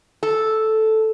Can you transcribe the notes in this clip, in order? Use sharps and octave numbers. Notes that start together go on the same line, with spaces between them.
A4